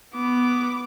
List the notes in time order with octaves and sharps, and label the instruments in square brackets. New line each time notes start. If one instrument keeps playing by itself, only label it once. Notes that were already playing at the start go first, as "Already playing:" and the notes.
[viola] B3 [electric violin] D6